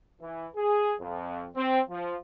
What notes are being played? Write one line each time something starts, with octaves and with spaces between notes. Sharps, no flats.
E3
G#4
F2
C4
F3